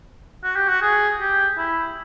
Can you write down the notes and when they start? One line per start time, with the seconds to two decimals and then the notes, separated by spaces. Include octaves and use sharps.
0.43 F#4
0.56 G4
0.69 F#4
0.82 G#4
1.20 G4
1.58 E4